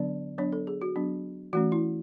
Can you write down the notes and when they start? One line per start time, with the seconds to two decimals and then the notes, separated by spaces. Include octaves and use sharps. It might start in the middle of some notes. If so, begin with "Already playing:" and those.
Already playing: D3 F#3 B3 D4 D5
0.38 F#3 B3 D4 C#5
0.52 A4
0.67 G#4
0.82 F#4
0.96 F#3 B3 D4
1.53 E3 A3 C#4 F#4
1.72 E4